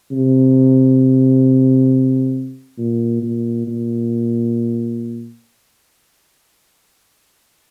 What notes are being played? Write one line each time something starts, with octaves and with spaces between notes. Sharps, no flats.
C3
A#2
A#2
A#2